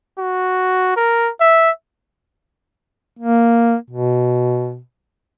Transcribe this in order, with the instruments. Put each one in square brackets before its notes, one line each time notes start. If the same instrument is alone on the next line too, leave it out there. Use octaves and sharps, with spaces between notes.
[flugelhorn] F#4
A#4
E5
[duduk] A#3
B2